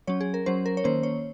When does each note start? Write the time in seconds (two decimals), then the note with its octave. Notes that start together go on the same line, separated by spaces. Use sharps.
0.07 F#3 C#4 C#5
0.21 G#4
0.34 A#4
0.46 F#3 C#4 C5
0.66 A#4
0.77 C#5
0.84 D#3 A#3 C#4 C5
1.03 C#5